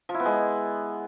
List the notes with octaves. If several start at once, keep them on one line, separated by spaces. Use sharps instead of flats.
F3
E4
B3
G#3